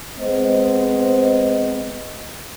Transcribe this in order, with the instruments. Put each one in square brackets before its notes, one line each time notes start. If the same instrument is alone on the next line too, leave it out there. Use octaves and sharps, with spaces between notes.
[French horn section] G#3 B3 C4 C5 D#5